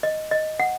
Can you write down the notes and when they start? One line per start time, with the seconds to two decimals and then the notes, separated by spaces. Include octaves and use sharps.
0.03 D#5
0.31 D#5
0.60 F#5